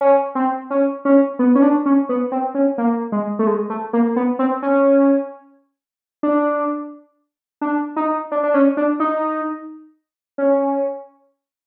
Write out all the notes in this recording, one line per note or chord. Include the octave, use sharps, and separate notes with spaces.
C#4
C4
C#4
C#4
B3
C#4
D4
C#4
B3
C4
C#4
A#3
G#3
A3
G#3
A3
A#3
B3
C4
C#4
D4
D4
D#4
D4
D4
C#4
D4
D#4
C#4